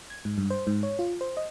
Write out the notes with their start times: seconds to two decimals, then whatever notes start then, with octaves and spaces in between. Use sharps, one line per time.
0.10 G#6
0.25 G#2
0.38 G2
0.50 C5
0.67 G#2
0.83 C#5
0.99 F4
1.21 C5
1.37 D#5